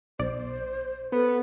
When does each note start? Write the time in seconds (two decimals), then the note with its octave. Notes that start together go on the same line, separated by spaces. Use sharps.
0.19 B1 C5 D5
1.12 B3 A4 B4